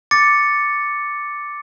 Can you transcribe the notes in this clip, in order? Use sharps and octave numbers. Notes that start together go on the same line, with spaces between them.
D6 A6 C#7